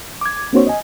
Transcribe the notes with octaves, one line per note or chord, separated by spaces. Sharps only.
D6 G#6
A#3 C4 D4 F#4 C5 C#5
D#5 G#5